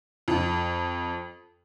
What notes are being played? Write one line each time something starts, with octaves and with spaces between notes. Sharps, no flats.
F2